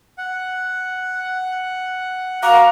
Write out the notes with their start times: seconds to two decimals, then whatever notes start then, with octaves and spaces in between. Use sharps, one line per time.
0.18 F#5
2.43 F#4 F5 A#5 D6